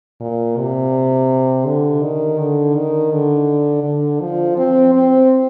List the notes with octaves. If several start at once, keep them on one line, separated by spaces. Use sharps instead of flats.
A#2
C3
D3
D#3
D3
D#3
D3
D3
F3
C4
C4